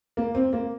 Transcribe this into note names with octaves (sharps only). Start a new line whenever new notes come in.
A#3
C4
A#3